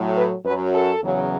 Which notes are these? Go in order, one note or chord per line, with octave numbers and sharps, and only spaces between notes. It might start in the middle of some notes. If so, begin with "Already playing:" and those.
Already playing: A2 F#3
B4
F#2 F#3 B4
A4
E2 C#3 F#3